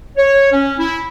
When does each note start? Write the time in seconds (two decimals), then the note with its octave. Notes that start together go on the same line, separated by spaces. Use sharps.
0.18 C#5
0.52 C#4
0.79 E4